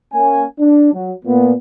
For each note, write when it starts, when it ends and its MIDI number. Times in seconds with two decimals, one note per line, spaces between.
0.13 0.44 58
0.13 0.44 61
0.13 0.44 80
0.59 0.93 62
0.93 1.13 54
1.25 1.53 46
1.25 1.53 59